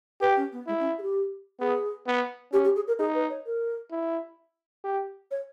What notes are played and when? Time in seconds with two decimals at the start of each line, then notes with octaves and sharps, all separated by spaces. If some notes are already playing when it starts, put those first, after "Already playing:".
0.21 G4 B4
0.36 C#4
0.52 B3
0.67 G#3 E4
0.79 C#4
0.98 G#4
1.02 G4
1.60 B3 G#4
2.07 B3
2.52 C#4 G4
2.64 G4
2.75 G#4
2.87 A#4
2.98 D#4 G#4
3.14 B4
3.29 C#5
3.46 A#4
3.91 E4
4.84 G4
5.31 C#5